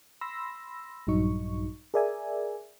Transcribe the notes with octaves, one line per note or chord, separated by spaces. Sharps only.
B5 C6 E6 A#6
A#1 G2 F#3 D#4 C#6
G#4 A#4 D5 E5 G#5